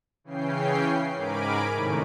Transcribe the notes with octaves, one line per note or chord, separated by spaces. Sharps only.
C#3 E3 C#4 G5 C7
G#2 A#4 G#5 B5 D6 D7
A2 C3 D#3 A3 C#4